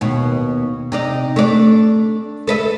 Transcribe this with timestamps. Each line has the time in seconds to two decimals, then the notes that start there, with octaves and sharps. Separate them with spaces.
0.01 D#2 B2
0.92 C3 D#4 D5
1.36 A3 D4 D5
2.47 A4 B4 E5